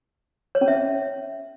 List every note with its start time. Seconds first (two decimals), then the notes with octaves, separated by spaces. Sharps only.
0.55 C#5
0.61 C#4
0.68 E5